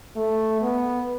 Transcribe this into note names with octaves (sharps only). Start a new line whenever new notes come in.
A3
B3